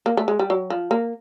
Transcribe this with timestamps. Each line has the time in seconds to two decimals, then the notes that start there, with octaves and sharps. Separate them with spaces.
0.06 A#3
0.17 A3
0.28 G#3
0.39 G3
0.50 F#3
0.70 F3
0.91 A#3